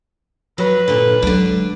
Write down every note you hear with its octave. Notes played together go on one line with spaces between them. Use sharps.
F#3 B4
A#2 D3
D3 F#3 G#3 D4